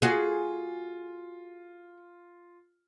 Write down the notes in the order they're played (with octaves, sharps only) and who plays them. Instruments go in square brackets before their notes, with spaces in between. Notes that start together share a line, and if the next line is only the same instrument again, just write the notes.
[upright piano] F4 [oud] F#4 G#4